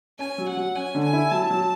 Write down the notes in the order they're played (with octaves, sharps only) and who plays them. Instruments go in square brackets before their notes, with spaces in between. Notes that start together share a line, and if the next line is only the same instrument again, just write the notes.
[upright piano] C#4 [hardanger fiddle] G#5
[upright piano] F#3
[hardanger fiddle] F#5
[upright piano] F#3
[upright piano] C#4 [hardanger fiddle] G#5
[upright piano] D3
[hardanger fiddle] G#5
[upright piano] E4
[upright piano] F#3 [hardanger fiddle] A5
[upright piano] F#3